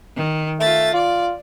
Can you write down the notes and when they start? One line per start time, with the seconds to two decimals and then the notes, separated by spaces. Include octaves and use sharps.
0.17 D#3
0.59 A3 F4 E5 A6
0.94 F4 D5